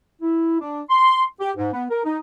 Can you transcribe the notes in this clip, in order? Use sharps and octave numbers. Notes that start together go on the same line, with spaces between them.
E4
D4
C6
G4
G#2
B3
A#4
D#4